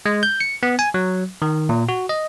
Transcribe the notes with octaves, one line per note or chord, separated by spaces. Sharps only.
G#3
G6
C#7
B3
G#5
F#3
D#3
A#2
F#4
D#5